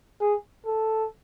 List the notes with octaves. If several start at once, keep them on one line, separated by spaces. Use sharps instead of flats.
G#4
A4